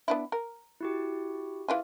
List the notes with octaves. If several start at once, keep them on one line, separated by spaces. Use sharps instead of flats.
B3 D4 E4
A#4
E4 F#4 G4
E3 F4 G#4